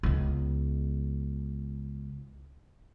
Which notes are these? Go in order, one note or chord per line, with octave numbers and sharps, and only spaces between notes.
C#2 B3